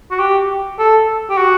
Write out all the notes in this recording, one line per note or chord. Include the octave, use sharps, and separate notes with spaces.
F#4
G4
A4
G4
F#4